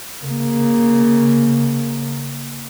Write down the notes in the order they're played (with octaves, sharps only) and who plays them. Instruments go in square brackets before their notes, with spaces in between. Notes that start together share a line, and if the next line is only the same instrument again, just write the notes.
[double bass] C#3 A#3